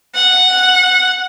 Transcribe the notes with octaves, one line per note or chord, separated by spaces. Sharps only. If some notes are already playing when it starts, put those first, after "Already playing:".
F#5